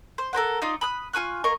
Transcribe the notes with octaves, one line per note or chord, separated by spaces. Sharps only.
C5
A4 A#4 C5 F#5
D#4 F4 D5
B5 D#6 F#6
F4 G#5 C#6 F#6
A#3 A#4 D#5 C#6